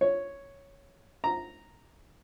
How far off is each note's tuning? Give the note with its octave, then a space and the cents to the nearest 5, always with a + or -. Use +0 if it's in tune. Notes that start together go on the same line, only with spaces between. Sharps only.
C#5 +0
A#5 -5